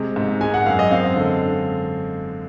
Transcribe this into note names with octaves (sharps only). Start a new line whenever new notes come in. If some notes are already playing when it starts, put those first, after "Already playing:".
Already playing: C3 G#3
G#2
G#3 G#5
F#5
F#2 F5
D#5
C4 F5
D3